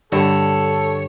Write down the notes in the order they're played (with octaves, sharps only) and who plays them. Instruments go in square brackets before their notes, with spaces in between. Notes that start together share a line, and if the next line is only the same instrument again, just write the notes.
[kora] G2 [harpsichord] D3 [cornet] A4 [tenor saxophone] C#5